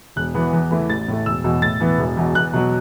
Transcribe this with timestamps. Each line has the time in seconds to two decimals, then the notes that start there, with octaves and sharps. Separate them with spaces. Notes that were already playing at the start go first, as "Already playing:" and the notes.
0.16 E1 F#6
0.35 E2 E3 B3
0.53 E2
0.71 E3 A3 E4
0.89 A1 A6
1.08 A2 A3
1.26 E1 E6
1.44 E2 B2
1.62 A2 A6
1.80 E3 B3
1.99 E1
2.17 E2 B2
2.35 E2 F#6
2.53 B2 F#3